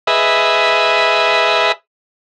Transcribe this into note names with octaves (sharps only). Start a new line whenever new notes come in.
G#4 B4 D#5 E5